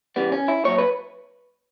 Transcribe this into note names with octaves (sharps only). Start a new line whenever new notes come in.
C#3 E3 G3 B3
C#4
E4
A#2 F#3 C#5
B4